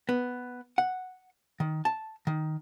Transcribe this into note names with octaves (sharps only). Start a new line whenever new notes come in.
B3
F#5
D#3
A5
D#3